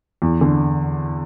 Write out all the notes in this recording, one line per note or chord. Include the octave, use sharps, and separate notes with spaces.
E2
D3